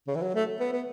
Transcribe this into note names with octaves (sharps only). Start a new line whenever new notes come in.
C#3
E3
F#3
A3
B3
B3